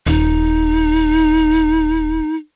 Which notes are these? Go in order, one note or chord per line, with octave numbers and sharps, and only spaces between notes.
D#1 D#4